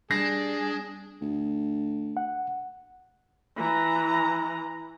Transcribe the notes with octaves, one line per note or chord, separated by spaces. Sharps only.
G3 D4 G#4 A#6 C7
D2
F#5
E3 A#5